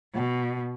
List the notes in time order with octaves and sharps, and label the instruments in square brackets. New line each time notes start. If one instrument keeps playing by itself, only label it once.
[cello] B2